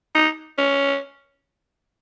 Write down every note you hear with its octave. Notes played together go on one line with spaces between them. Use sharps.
D#4
C#4